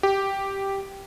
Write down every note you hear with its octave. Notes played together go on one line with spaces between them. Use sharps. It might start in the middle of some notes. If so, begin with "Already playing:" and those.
G4